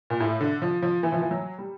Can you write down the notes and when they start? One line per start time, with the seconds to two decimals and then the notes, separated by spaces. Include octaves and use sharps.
0.10 A#2
0.20 A2
0.41 D3
0.62 F3
0.82 F3
1.03 E3
1.12 F3
1.22 E3
1.31 F#3
1.58 G3